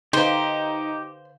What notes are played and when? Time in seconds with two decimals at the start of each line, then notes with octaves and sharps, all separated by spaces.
0.13 D3 D#4 G4 B4 C5 F5